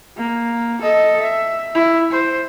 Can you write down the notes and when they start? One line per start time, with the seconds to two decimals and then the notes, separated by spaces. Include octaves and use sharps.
0.18 A#3
0.82 A4 D#5
1.21 E5
1.75 E4
2.11 C5